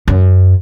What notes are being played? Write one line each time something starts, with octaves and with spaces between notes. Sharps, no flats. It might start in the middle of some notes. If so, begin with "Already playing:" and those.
F#2